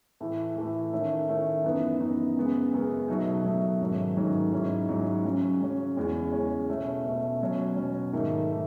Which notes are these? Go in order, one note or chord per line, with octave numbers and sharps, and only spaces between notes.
A2 E3 A3
A2 E3 A3
D#3 A3 C#4 E4
D#3 A3 C#4 E4
F#2 E3 B3 D#4
F#2 E3 B3 D#4
F#2 C#3 G#3 B3
F#2 C#3 G#3 B3
B2 F#3 A3 D#4
B2 F#3 A3 D#4
G#2 D#3 F#3 A3 C#4
G#2 D#3 F#3 A3 C#4
G#2 F#3 C#4 E4
G#2 F#3 C#4 E4
C#3 F#3 C#4
C#3 F#3 C#4
E2 C#3 G#3 C#4
E2 C#3 G#3 C#4
B2 A3 C#4
B2 A3 C#4
B2 F#3 C#4
B2 F#3 C#4
G#2 D#3 A3
D#3 A3